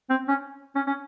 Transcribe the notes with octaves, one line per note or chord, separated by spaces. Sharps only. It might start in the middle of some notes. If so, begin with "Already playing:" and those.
C4
C#4
C#4
C#4